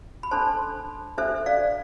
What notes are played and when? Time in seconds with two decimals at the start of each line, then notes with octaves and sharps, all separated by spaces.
0.23 B5
0.31 D4 A4 C5 A5 C6
1.18 D4 A4 C5 E5
1.46 D5 F5